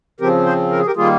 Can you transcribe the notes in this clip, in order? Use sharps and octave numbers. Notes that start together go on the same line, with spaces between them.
C#3 F3 C4 G4 A#4
G#4 C5
A#4
G#4
G4 A#4
D#3 G3 A#3 F4 G#4